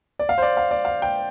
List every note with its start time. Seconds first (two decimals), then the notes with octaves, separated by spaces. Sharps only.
0.19 D5
0.29 F5
0.38 C5
0.42 D5
0.57 F5
0.71 D5
0.85 F5
1.02 G5